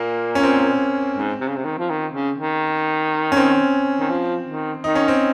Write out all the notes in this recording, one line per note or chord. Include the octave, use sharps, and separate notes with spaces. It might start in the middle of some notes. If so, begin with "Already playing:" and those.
Already playing: A#2 A#3
C#4
C4
G#2
C3
C#3
C3
D#3
F3
D#3
C#3
D#3
C#4
C4
D#3
F3
D#3
D#3 D#4
C#4
C4